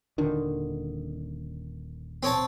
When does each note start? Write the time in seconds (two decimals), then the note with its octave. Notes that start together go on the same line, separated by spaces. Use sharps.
0.18 D#1 D3 D#3
2.23 C4 C#5 A5